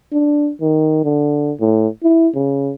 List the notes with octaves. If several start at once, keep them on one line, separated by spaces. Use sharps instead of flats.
D4
D#3
D3
A2
E4
C#3